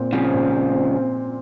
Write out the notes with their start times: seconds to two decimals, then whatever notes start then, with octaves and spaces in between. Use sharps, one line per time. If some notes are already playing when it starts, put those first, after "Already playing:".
Already playing: A#2 C4
0.13 C#3 F3 C4
0.33 A#2
0.53 C4
0.72 C4
0.93 C4